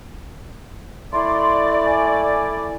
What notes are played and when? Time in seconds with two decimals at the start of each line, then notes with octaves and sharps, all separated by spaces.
1.13 A3 E4 D5 C6
1.86 G#5